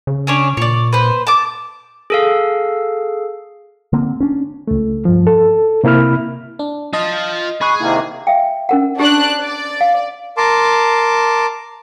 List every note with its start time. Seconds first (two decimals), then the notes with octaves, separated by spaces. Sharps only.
0.07 C#3
0.27 C#4 D4 C#5
0.57 A#2 C#5 D5
0.93 B4 C5
1.27 A5 D6
2.10 G#4 A4 F5
3.93 D3 A#3 C4
4.20 C#4 D4
4.68 C#2 A3
5.05 G2 F3
5.27 A4
5.84 C3 A#3 E4 B5 F6
6.59 D4
6.93 F4 D#5 A5
7.61 G#4 B5 C#6 F#6
7.80 C3 D#3 A#3 E4
8.27 E5 F5 G5
8.69 C#4 A#4 F#5
8.99 D4 G4 F#6
9.41 D5
9.81 F5
10.37 A#4 A5 C6 D6